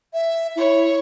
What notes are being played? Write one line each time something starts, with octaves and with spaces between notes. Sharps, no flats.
E5
E4 C#5